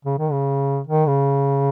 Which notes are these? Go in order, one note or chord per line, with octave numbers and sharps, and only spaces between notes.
C#3
D#3
C#3
D#3
C#3